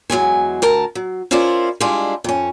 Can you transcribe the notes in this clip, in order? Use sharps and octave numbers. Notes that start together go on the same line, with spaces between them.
E2 F#3 G#3 G#5
D2 A#4 A5
F#3
C#4 E4 F4 A#4 C5 D5
G3 G#3 D4 E4 F4
F2 C#4